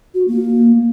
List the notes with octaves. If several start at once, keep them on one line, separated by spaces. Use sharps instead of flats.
F#4
A#3